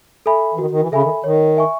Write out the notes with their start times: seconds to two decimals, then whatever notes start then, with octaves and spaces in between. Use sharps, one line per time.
0.26 A4 E5 G#5 B5
0.54 E3
0.58 D#3 F#4
0.71 D#3
0.81 E3
0.92 C#3 A4 E5 G#5 B5
1.03 D#3
1.24 D#3 C#5
1.57 E5 G#5 C#6